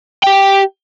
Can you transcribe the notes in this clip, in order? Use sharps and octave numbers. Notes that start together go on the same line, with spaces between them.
G4 G5